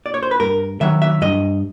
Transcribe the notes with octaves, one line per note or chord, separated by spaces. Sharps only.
D5
C#5
C5
B4
G2 A#4
D#3 F#3 E5
E5
G2 D#5